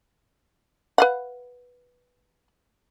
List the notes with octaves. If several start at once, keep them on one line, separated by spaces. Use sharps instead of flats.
B4 F5 F#5